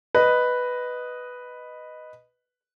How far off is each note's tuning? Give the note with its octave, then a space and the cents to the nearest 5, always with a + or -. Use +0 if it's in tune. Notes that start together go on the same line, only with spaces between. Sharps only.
B4 +0 D#5 -5